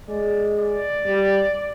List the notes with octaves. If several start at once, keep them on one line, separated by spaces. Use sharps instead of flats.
G#3 D5
D5
G3